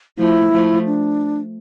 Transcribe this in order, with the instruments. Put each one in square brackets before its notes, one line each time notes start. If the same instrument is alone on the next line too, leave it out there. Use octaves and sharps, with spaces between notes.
[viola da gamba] F3 A3 [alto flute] E4
[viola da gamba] F3 A3
[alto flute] D4